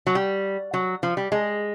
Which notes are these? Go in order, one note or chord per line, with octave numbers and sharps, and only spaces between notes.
F#3
G3
F#3
F3
G3
G#3